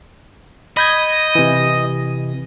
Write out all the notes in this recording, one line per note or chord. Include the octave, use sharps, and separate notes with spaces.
D#5 B5 G6 G#6
C3 E3